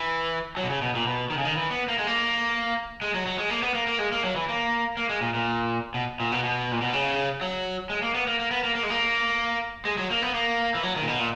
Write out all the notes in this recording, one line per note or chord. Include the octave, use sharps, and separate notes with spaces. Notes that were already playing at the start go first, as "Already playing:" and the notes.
Already playing: E3
F#3
B2
C#3
B2
A#2
B2
D#3
C#3
D#3
E3
B3
A#3
G#3
A#3
G#3
F#3
F#3
G#3
A#3
B3
A#3
A#3
G#3
A#3
F#3
E3
A#3
A#3
G#3
A#2
A#2
B2
A#2
B2
B2
A#2
B2
C#3
F#3
G#3
A#3
B3
A#3
A#3
B3
A#3
A#3
G#3
A#3
G#3
F#3
A#3
B3
A#3
E3
F#3
D#3
A#2
B2
A#2